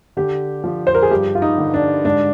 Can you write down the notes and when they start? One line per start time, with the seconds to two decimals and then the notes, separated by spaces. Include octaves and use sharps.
0.17 D3 G4
0.64 F3
0.87 C5
0.95 A#4
1.02 G#4
1.10 G2 G4
1.35 F4
1.42 D#4
1.58 D3
1.74 D4
2.04 G#2 D4